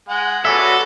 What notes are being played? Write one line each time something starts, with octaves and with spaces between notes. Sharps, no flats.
G#3 F#5
G#3 B3 C#4 F#4 A4 D5 E5